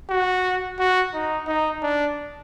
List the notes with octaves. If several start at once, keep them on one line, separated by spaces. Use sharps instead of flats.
F#4
F#4
D#4
D#4
D4